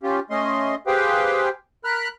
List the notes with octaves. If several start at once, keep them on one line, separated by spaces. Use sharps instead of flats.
C#4 F4 G4
A3 C#4 D#5 C6
G4 G#4 B4 C5 F5 G5
A#4 B5 F6 F#6